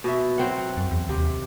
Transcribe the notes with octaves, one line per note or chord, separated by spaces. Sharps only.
B2 E5
F#3 C4 F#5
F#2
E2
D#2 C3